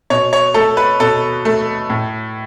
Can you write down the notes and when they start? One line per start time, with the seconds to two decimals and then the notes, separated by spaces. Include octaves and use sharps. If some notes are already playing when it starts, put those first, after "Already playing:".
0.10 B2 C#5
0.33 C#5
0.54 A3 A4
0.77 B4
1.00 B2 A4
1.45 A3
1.90 A2